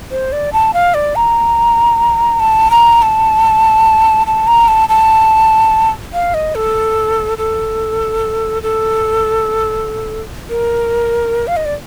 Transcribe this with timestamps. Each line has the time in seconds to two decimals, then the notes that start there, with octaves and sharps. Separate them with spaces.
0.11 C5
0.32 D5
0.53 A5
0.74 F5
0.94 D5
1.15 A#5
2.40 A5
2.71 A#5
3.02 A5
4.27 A5
4.47 A#5
4.68 A5
4.89 A5
6.13 F5
6.34 D#5
6.55 A4
7.38 A4
8.62 A4
10.49 A#4
11.47 F5
11.56 D#5
11.65 D5